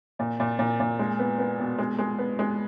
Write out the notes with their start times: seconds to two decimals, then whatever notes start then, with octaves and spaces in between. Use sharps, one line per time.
0.19 A#2
0.40 A#2
0.59 A#2
0.80 A#2
0.99 G#3
1.19 B3
1.39 B3
1.59 B2
1.78 G#3
1.98 G#3
2.19 B3
2.39 G#3